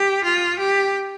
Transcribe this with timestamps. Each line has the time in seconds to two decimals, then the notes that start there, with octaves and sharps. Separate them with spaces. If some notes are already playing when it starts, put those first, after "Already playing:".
Already playing: G4
0.24 F4
0.59 G4